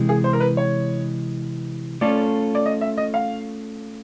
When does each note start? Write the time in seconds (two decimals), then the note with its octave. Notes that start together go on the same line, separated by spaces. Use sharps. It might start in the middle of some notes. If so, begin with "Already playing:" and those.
Already playing: C3 E3 G#3
0.09 G#4
0.24 C5
0.33 A#4
0.40 B4
0.57 C#5
2.01 A3 C#4 F4 A4 D5
2.55 D5
2.66 D#5
2.81 E5
2.97 D#5
3.14 F5